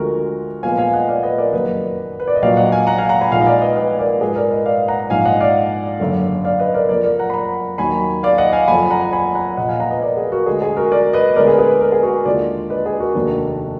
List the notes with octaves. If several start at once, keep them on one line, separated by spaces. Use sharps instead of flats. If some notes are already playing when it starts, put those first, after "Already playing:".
Already playing: D2 D3 F3 G#3 F#4 A#4
A#2 F3 G#3 B3 F5 G#5
F5 G#5
G#5
D#5 F#5
D5 F5
B4 D#5
A#4 D5
F#1 F2 D#3 F#3 A#3 B4 D#5
B4
D5
D#5
A#1 A#2 F#3 D5 F5
D#5 F#5
F5 G#5
F#5 A#5
F5 G#5
F#5 A#5
G#5 B5
A#1 A#2 G#3 D#4 F5 G#5
D#5
D5 F5
B4 D#5
B4 D#5
A#4 D5
G#2 F3 G#3 G#4 B4
A#4 D5
B4 D#5
D5 F5
F#5 A#5
A#1 G#2 F3 F5 G#5
D#5 F#5
D5 F5
F#1 F#2 D3
D5 F5
B4 D#5
A#4 D5
F#1 F2 F3 A#3 A#4 D5
A#4 D5
F#5 A#5
B5
F#5 A#5
D#2 D#3 F#3 G#5 B5
D5 F5
D#5 F#5
F5 G#5
F#1 F2 F3 G#5 B5
F#5 A#5
G#5 B5
F#5 A#5
A#1 A#2 F3 D#5 F#5
F5 G#5
F#5 A#5
B4 D#5
A#4 D5
G#4 B4
F#4 A#4
D2 D3 G#3 G#4
G#4
F#4 A#4
A#4 D5
B4 D#5
D2 D3 G#3 B3 A#4 D5
G#4 B4
G#4 B4
B4
A#4
G#4
F#4 A#4
D#2 D3 G#3 D4 F4 A#4 D5
B4 D#5
G#4 B4
F#4 A#4
F1 D#2 D#3 A#3 D4